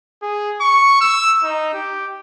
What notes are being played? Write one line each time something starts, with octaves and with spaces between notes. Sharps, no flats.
G#4
C#6
E6
D#4
G4